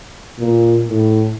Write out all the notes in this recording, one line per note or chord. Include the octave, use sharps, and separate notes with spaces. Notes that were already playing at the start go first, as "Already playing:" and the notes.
A#2
A2